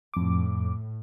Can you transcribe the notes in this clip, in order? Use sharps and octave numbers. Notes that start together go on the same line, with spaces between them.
F2 A2 D6